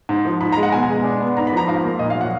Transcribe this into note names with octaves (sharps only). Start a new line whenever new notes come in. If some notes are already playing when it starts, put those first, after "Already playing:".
G#2
F3
G#2 B5
A#5
G#3
F#5
B2 G#5
G#3
D4
B3
G#2 A#5
B5
F3 A#5
G#2 F5
A#3
A#2 D#5
F5
F#3
F#5